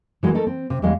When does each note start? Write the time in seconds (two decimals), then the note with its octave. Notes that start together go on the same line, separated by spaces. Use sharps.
0.23 E3 G#3 F#4 A#4
0.34 A3 D#4 A4 A#4
0.47 C4
0.70 C3
0.82 E2 G3 G#3 D#5 F5